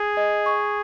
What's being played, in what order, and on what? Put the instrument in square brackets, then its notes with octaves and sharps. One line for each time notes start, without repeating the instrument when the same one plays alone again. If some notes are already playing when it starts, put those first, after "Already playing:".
Already playing: [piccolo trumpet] G#4
[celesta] D#5
C#6